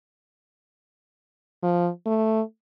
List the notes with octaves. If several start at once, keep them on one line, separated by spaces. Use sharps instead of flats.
F3
A3